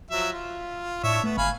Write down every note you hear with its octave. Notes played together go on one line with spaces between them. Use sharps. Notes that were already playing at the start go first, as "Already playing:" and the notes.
F3 F#3 E5
F4
A2 D4 C#5 E5
A3 B3
G1 F5 G#5 B5